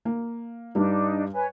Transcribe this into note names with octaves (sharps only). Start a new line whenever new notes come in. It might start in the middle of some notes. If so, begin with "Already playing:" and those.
A#3
G2 G3 D4 D#4
B4 C#5 G#5